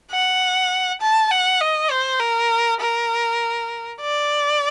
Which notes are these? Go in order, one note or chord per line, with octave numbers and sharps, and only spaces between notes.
F#5
A5
F#5
D#5
C5
A#4
A#4
D5